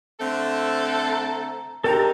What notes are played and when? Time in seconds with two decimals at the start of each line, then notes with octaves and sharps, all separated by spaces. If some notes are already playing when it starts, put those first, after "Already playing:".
0.20 D3 A3 C4 A4
1.13 A#5
1.84 C4 D4 D#4 G4 A4 A#4 G5 A#5